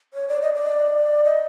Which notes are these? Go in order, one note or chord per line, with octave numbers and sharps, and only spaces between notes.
C#5
D5
D#5
D5
D#5